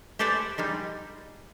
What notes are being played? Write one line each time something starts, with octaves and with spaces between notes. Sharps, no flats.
G4 A4 B4 C5 D5 G#5
G3 G#3 D#4